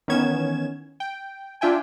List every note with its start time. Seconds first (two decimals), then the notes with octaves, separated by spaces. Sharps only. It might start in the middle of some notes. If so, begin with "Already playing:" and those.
0.08 D#3 E3 B3 C#4 G#6 E7
1.00 G5
1.61 D4 F4 E5 G5 G#5